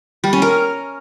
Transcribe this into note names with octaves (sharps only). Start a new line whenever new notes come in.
G3
C#4
A#4